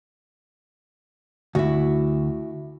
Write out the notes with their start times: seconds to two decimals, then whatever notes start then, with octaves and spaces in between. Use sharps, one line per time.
1.55 D2 E4 F#4